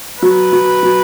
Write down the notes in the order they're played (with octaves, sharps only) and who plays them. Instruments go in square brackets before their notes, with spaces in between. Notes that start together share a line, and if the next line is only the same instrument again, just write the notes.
[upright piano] F#3 [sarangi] B4
[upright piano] F#3
F#3